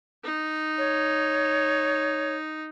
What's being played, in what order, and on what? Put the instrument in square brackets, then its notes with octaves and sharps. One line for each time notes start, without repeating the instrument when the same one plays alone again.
[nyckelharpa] D#4
[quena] C#5